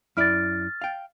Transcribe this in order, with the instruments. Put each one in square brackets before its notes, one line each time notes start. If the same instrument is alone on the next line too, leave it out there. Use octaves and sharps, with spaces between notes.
[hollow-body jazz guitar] F#2 E4 D5 [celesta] F6 A6
[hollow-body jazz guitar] F5 G5